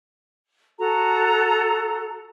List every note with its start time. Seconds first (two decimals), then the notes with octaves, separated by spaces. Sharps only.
0.78 F#4 A4 A#5